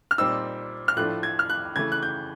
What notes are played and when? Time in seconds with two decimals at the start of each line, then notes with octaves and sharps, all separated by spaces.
0.11 F6
0.18 A#2 G3 C4 D#4 E6
0.88 F6
0.96 A2 F3 A3 D4 F#6
1.23 G#6
1.39 F6
1.50 F#6
1.76 C#3 E3 A3 G#6
1.92 F#6
2.03 G6